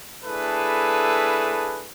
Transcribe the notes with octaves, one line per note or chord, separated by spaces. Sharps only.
A3 D4 E4 G#4 A4 B4